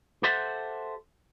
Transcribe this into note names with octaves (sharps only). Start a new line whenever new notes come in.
G4 A4 C5 E5 F#5